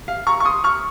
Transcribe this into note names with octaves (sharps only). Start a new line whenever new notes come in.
F5
A#5 C#6
C#6
C6 D#6
C#6 F6